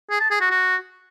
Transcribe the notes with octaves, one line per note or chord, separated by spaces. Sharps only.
G#4
A5
G#4
F#4
F#4